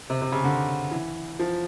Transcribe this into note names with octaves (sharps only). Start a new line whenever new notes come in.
C3
C3
C#3
D3
E3
F3